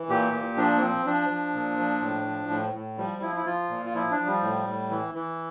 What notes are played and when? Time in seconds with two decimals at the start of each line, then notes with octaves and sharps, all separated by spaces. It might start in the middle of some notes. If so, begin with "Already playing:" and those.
Already playing: E3
0.09 A#2 G4
0.33 A#2
0.57 F3 D4
0.77 A#3
0.81 F3 C4
1.06 F3 D4
1.30 F3
1.54 A#2
1.78 F3
2.01 A2
2.25 F3
2.50 A2
2.74 A2
2.97 F3 G3
3.22 F3 E4
3.36 E4
3.46 F3 F4
3.70 A#2
3.86 F4
3.94 F3 E4
4.11 D4
4.19 F3
4.26 G3
4.43 A2
4.67 A2
4.90 E3
5.15 E3